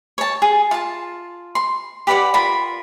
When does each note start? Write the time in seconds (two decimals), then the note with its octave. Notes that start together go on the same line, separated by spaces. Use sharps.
0.18 C#5 A5
0.42 G#4
0.71 F4 A5
1.55 C6
2.07 G4 B4 D5 F#5
2.34 F4 A#4 B5